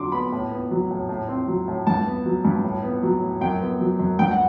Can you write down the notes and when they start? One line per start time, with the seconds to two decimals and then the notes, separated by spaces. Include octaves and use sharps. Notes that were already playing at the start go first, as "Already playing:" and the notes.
Already playing: D3 F#3 C6 D6
0.12 B3 B5
0.32 A2
0.52 B3
0.71 F#3
0.91 A2
1.09 A2
1.28 C4
1.48 F#3
1.68 A2
1.87 G2 A5
2.06 B3
2.26 F#3
2.45 G2
2.64 A2
2.83 B3
3.03 F#3
3.23 A2
3.41 F#2 G5
3.61 B3
3.81 F#3
3.99 F#2
4.19 G2 G5
4.31 F#5